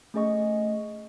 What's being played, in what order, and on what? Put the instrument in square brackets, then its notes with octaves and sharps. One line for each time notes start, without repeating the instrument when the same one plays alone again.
[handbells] A3 C#4 G#4 D#5 C#6